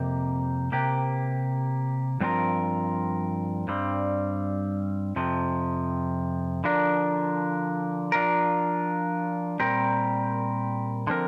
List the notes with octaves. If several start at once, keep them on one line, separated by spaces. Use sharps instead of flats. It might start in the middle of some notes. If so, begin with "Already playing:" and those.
Already playing: F2 C3 A#3 G4
C3 A#3 G4
G2 F3 C4 F4 A#4
G2 G3 C4
F2 C3 F3
D3 F3 D4 A#4
F3 D4 F4 A#4
A#2 G3 C4 G4 A#4
D3 F3 C4 A#4